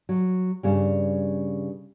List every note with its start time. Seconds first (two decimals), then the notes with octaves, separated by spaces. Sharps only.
0.09 F#3
0.63 G2 C#3 G3